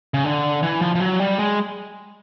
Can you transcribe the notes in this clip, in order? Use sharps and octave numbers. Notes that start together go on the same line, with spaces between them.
C#3
D3
E3
F3
F3
F#3
G3
G#3